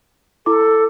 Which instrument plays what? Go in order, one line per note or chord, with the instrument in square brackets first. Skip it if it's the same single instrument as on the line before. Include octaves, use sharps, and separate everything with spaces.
[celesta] E4 D6 [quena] A4